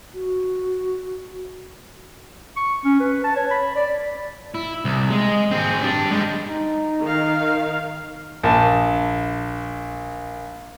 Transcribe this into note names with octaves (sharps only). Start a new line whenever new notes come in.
F#4
C#6
C#4
B4
A5
C#5
B5
D5
E4
C2
G#3
C4 G#4
D4 G4
G3 G#3
D#4
D#3 F5
A#1 A5